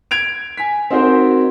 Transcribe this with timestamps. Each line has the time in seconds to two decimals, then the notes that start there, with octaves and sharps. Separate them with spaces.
0.11 G#6 D7 F7
0.57 G#5 B6
0.90 C4 D#4 F#4 A#4 C5